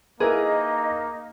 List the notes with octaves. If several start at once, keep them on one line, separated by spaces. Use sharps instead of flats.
A#3 D#4 E4 G#4 A#4 B4 D#5